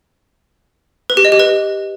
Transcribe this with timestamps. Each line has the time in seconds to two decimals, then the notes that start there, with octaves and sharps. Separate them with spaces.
1.10 B4
1.17 G4
1.25 D#5
1.32 G4
1.40 B4